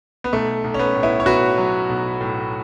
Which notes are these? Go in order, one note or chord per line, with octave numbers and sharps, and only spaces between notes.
B3
B1 A3
B1
C#4
B3
A2
B3 E4
C#5
B1 F#4 B4
F#3
B1
A2